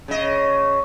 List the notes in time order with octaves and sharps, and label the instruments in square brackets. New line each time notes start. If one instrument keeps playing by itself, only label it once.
[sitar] C#3 D#5